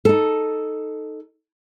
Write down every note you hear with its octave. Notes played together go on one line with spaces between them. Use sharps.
D#4 A4